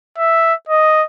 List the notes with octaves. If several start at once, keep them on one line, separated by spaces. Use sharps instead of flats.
E5
D#5